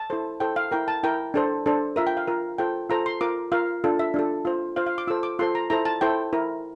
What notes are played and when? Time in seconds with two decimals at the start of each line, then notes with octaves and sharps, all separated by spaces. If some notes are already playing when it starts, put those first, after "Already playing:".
Already playing: A5
0.10 E4 A4 C5
0.40 E4 A4 C5 G5
0.56 F5
0.71 E4 A#4 G5
0.88 A5
1.03 E4 A#4 G5
1.34 D4 A4 C5
1.66 D4 A4 C5
1.96 F4 A#4 E5
2.07 G5
2.17 F5
2.27 F4 A#4
2.58 F4 A4 C5 G5
2.90 F4 A4 C5 A#5
3.06 C6
3.21 F4 A#4 D6
3.52 F4 A#4 F5
3.84 D4 F4 A4
3.99 E5
4.14 D4 F4 A4
4.45 F4 C5
4.76 F4 C5 F5
4.87 F5
4.98 D6
5.07 F4 A4 C5 E6
5.23 D6
5.39 F4 A4 C5 C6
5.55 A#5
5.70 E4 A4 C5 A#5
5.85 A5
6.01 E4 A4 C5 G5
6.33 E4 A#4